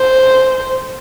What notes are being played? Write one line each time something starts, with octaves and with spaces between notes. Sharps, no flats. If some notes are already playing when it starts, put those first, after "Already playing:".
Already playing: C5